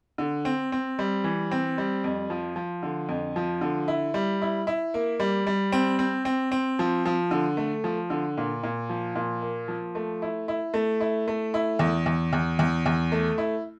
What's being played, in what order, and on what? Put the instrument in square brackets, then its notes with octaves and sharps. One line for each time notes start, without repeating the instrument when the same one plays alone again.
[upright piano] D3
C4
C4
G3
E3
C4
G3
F2
F3
F3
D3
F2
F3
D3
E4
G3
E4
E4
A#3
G3
G3
C4
C4
C4
C4
F3
F3
D3
A3
F3
D3
A#2
A#2
F3
A#2
A#3
F3
A3
E4
E4
A3
E4
A3
E4
E2
E2
E2
E2
E2
A3
E4